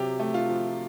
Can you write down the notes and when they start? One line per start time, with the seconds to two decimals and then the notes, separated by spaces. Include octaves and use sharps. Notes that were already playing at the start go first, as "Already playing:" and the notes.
Already playing: C3 F#3 G4
0.19 A3
0.34 F4
0.49 F3